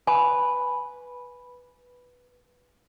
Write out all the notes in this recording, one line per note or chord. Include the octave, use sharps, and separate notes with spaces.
B4 G#5